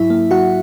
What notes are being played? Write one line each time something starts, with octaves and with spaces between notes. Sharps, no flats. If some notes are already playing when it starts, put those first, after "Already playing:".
Already playing: G#2 F#3 E4 E5
A#3
F#3 F#4 F#5